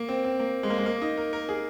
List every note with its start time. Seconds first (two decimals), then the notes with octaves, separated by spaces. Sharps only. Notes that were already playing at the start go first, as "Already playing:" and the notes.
Already playing: A#3
0.09 C4
0.24 C4
0.40 A#3
0.63 G#3
0.70 A#3
0.78 G#3
0.86 A#3
1.02 D#4
1.17 A#4
1.33 A#4
1.49 G#4